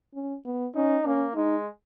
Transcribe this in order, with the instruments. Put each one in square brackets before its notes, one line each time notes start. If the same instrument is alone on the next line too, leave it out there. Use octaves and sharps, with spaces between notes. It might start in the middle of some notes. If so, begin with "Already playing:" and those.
[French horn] C#4
B3
[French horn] C#4 [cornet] D#4
[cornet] A#3 [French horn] C#4
[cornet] G#3 [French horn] D#4